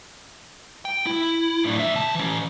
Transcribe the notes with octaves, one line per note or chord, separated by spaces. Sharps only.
G5
E4
A2 D4
F2 E5
C#2 A5
E3 C#4